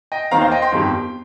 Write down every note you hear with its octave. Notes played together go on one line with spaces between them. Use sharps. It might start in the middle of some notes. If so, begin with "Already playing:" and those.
D#5 G5
D#2 D#3 C4 F5 A#5
C5 F5
D#5 G5
G5 C6
G1 F2 D#3 G3